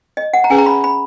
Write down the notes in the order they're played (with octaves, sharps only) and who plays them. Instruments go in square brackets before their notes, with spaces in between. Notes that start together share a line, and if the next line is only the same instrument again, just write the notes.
[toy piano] D#5
F#5
A#5
[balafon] C#4 G#4 B4 [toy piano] G#5
[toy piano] A#5
B5
B5